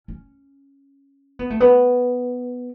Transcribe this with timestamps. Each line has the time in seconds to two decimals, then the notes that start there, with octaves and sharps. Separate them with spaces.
0.08 C#4
1.39 B3
1.50 A3
1.60 B3